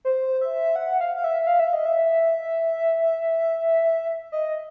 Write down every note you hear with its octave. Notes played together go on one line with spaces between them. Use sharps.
C5
E5
F#5
F5
F5
E5
F5
E5
D#5
E5
D#5